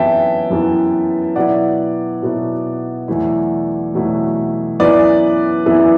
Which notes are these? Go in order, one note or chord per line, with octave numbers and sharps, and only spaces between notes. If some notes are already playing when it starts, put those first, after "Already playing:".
Already playing: F#2 E3 B3 E4 E5 G5 A5
F#2 E3 B3 E4
B2 F#3 B3 E4 D5 F#5
B2 F#3 B3 E4
E2 B2 F#3 A3 E4
E2 B2 F#3 A3 E4
F#2 E3 B3 E4 B4 D5
F#2 E3 B3 E4